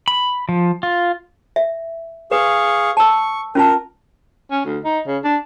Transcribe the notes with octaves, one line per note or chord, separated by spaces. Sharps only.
B5
F3
F4
E5
G#4 B4 F5 C#6
A5 C#6 E6
C#4 F4 A#4 A5
C#4
D2
D#4
C#3
D4